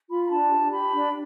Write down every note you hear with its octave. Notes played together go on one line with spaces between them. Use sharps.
F4 B5
B5
D4 A5
G4
G4 B5
D4